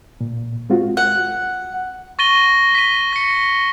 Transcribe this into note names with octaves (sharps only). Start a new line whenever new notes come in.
A#2
G#3 C4 F4 F#4
F#5
C#6 A6 A#6 D#7 G7
B6 D#7
A#6 C#7